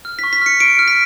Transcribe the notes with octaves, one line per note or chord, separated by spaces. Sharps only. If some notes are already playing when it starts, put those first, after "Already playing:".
F6
C#6 B6
B6
F6 C#7
C#6 D7
F6
B6